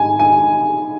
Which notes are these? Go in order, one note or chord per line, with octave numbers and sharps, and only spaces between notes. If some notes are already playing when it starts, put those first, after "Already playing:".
Already playing: G#2 G#5
G#5